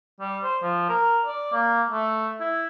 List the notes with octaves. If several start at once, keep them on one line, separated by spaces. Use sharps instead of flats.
G3
C5
F3
A#4
D5
A#3
A3
E4